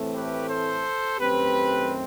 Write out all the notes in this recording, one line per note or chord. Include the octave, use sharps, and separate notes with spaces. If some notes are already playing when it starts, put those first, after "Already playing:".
Already playing: A2 E3 A3 C4
G4 B4
A4 C5
F#2 D#3 A3 C4 G4 B4